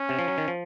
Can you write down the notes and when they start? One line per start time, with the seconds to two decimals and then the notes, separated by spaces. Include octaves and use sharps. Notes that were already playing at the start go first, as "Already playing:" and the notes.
Already playing: C#4
0.09 C3
0.19 F3
0.28 F#3
0.38 D#3
0.48 F3